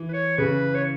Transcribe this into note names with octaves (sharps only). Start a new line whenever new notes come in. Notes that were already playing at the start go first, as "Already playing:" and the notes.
Already playing: E3
B4
C#5
C#3 B4
C#5